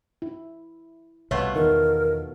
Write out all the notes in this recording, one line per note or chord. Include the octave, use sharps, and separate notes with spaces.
E4
C2 B2 A3 F4 C#5 F#5
E2 D#3 A#4